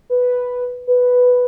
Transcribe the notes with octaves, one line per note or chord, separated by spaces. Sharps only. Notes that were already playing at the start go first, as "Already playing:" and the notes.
B4
B4